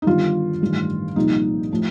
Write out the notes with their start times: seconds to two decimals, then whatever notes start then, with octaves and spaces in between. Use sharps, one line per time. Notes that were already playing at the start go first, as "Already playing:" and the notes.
0.02 D#4
0.06 G1 G2 D#3 F4
0.62 A1 G2 D#3
1.16 C2 A#2 F3 D#4
1.71 A2 F3